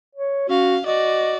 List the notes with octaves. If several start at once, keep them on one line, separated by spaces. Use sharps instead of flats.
C#5
C#4 F#4 F5
F#4 D5 D#5